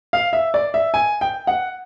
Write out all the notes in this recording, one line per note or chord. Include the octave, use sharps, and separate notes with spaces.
F5
E5
D5
E5
G#5
G5
F#5